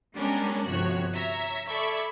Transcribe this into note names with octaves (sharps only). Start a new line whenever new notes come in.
G3 G#3 B3 C#4 D4 A#4
G1 C3 F3 F#4 C#5 F#6
C#5 E5 A#5
A4 D5 E5 B5 C#6 G#6